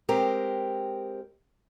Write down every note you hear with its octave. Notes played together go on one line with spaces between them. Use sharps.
G#3 C4 G4 A#4